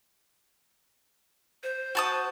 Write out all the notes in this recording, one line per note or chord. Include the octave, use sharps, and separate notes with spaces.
C5
F#4 A5 D#6